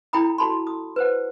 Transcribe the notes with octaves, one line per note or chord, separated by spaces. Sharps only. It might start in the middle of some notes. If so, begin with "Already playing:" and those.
E4 A4 G5 A#5 B5 D#6
F#4 A4 A5 B5 C6
D#6
B4 C5 F#5